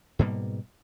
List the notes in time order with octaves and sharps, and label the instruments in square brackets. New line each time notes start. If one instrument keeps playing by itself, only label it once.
[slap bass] G#2 B2 G3 A#3